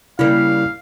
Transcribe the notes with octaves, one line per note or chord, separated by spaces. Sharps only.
C#3 G3 A#3 E4 F5